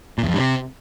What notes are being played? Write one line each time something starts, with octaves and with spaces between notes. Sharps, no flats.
A#2
E2
F2
G2
C3